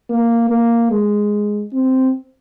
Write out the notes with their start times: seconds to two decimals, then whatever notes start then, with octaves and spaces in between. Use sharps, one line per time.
0.10 A#3
0.50 A#3
0.91 G#3
1.73 C4